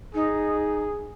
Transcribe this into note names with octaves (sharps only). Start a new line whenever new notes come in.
D#4 G#4